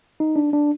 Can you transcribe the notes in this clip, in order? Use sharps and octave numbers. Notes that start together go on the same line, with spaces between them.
D#4
D4
D4